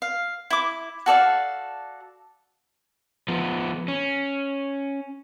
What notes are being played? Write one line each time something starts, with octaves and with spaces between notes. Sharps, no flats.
F5
E4 D6
F#4 A4 D5 F5
F3 B3
C#4